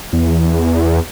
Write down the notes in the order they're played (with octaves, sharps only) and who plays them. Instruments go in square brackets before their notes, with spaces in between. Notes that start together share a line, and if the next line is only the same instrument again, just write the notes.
[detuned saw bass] E2